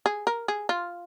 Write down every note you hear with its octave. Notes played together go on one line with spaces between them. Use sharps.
G#4
A#4
G#4
F4